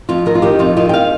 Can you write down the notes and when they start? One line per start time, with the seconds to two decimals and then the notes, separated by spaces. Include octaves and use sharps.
0.09 F2 F4
0.26 D#3 A#4
0.35 F4
0.42 D#3 G4
0.59 F2 F4
0.77 D#3 F4
0.89 G5
0.94 F5